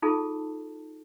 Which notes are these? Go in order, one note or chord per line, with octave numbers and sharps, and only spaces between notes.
D#4 F4 G#4 A4 A5